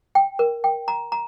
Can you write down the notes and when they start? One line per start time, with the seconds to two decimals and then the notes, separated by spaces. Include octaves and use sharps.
0.15 G5
0.39 A#4
0.64 G5
0.88 A#5
1.12 A#5